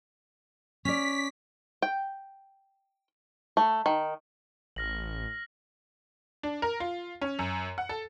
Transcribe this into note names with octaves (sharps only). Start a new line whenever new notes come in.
C#4 D5 B6
G5
A3
D#3
A1 F6 A#6 F#7
D4
A#4
F4
C#4
F#2
F#5
A4